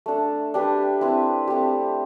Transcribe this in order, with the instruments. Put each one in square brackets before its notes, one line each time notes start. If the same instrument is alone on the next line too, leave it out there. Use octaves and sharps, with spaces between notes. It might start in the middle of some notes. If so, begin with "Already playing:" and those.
[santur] A3 D4 A4
D4 G4 B4
C4 E4 B4
A3 C4 G4